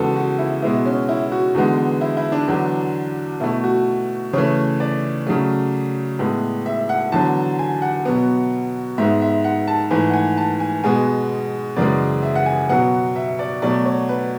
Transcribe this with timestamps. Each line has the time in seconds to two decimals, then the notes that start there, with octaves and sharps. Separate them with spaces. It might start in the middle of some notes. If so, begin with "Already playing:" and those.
Already playing: E2 C#3 G#3 B3 F#4 A4
0.16 F#4
0.39 E4
0.62 B2 G#3 B3 E4
0.86 C#4
1.09 E4
1.32 F#4
1.55 E2 D3 G#3 B3
2.01 E4
2.17 E4
2.32 D4
2.48 E2 D3 F#3
3.40 B2 A3 E4
3.64 F#4
4.33 C#3 E3 A3 C#5
4.80 D5
5.27 C#3 F#3 A3
6.19 A2 G#3 B3
6.66 E5
6.89 F#5
7.12 E2 D3 F#3 A5
7.59 G#5
7.82 F#5
8.05 B2 F#3 B3
8.98 G#2 G#3 B3 E5
9.22 E5
9.44 F#5
9.68 A5
9.91 G#2 E3 A3 G#5
10.09 F#5
10.14 G#5
10.37 A5
10.60 G#5
10.84 B2 G#3 B3 G#5
11.76 F#2 C#3 E3 G#3 D5
12.23 E5
12.35 F#5
12.46 G#5
12.69 B2 F#3 B3 F#5
13.16 E5
13.39 D5
13.62 B2 F#3 A3 D5
13.85 C#5
14.09 B4